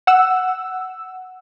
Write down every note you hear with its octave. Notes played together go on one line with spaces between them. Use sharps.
F#5 E6